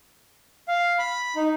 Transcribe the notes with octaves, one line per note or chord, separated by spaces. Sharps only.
F5
B5
D#4